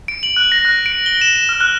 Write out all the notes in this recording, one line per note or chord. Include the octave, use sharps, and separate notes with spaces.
D7
F#7
F#6
A#6
F#6
D7
G7
E7
E7
F6
F#6